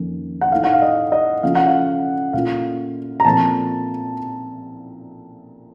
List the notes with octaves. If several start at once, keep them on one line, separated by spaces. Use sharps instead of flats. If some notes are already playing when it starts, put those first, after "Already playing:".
Already playing: F2 D#3 A#3 C#4
F#5
A2 A3 D#4 F5
F#5
F5
D#5
D#5
C#3 F3 A3 C#4 F4 F5
F#5
F5
A#2 A3 C#4 F4 F5
A#5
A#2 F3 A3 C4 A5